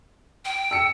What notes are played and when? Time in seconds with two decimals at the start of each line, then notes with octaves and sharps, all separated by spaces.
0.45 G5
0.71 E6 C#7